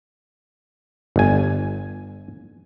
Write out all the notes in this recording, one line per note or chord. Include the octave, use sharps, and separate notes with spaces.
G1 G#5